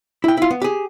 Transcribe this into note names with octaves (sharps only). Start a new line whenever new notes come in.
E4 G5
E4 F4
B3
G4 G#4